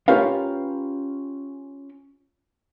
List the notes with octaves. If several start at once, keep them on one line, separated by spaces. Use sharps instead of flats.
C#4 F4 G4 A#4 B4 F5